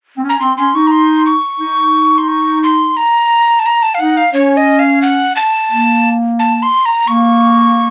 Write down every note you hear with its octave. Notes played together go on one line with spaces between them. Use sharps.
C4
C#4
A#5
C4 C6
C#4 C6
D#4 C#6
A#5
C6
C#6
D#4
C6
C#6
C6
A#5
A5
A#5
A5
F5
D#4 F#5
F5
C#4 C#5
D#5
F5
F#5
A5
A#3
A5
C6
A#5
A#3 C#6